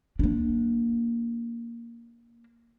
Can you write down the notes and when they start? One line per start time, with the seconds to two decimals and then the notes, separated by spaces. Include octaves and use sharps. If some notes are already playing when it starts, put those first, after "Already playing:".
0.19 A#3 D4